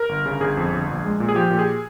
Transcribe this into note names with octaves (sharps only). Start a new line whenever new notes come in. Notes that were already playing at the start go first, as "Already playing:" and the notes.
Already playing: A#4
G1
C#3
G1 G#4
F2
G1
A#1
G#3
A#2
G#4
F3 G4
A#2
G#4